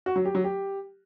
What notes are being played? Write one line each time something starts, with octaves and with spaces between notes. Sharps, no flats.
F#4
F#3
G4
F#3
G4